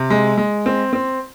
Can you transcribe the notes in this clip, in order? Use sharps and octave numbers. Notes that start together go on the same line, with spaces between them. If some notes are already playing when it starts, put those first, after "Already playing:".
Already playing: C3
G#3
G#3
C4
C4